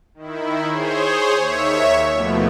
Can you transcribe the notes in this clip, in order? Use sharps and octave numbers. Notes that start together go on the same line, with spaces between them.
D#3 E4
G#4 C5 C#5
D#2 C#5 E5
D#2 B2 F3 A3 B3